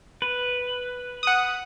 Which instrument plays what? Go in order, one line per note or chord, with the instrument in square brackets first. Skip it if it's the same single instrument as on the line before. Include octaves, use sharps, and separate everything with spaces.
[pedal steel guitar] B4
[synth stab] F#5 D#6